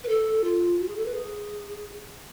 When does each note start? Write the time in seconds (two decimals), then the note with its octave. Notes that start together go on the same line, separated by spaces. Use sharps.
0.04 B4
0.08 A4
0.44 F4
0.80 F#4
0.88 G#4
0.96 A4
1.06 B4
1.14 G#4